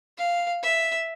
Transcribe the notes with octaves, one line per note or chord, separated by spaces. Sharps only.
F5
E5